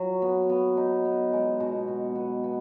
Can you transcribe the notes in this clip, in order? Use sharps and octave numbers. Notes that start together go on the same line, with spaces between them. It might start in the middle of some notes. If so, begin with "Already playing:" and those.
Already playing: F#3
B3
B3
D#4
B3
G#3
B2
B2
B3
B3